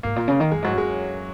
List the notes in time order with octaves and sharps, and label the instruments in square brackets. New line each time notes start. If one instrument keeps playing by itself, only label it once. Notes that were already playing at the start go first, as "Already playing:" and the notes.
[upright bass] G#2 [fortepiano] A#3
[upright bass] A#2
C#3
D#3
[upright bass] F#2 [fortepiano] G#3
[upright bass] G#2 [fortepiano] F#3
[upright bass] F#2 [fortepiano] G#3